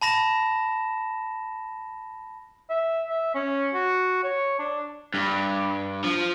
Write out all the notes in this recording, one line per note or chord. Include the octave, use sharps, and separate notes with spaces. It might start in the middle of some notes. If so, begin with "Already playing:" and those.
A5 B5 A#6 E7
E5
E5
C#4
F#4
C#5
D4
G2
F3